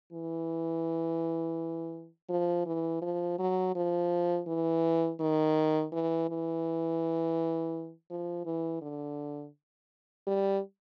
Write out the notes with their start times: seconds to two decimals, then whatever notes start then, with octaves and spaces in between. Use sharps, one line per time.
0.13 E3
2.29 F3
2.66 E3
3.02 F3
3.39 F#3
3.75 F3
4.47 E3
5.20 D#3
5.92 E3
6.29 E3
8.10 F3
8.45 E3
8.82 D3
10.27 G3